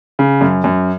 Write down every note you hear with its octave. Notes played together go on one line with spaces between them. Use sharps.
C#3
F#2
F#2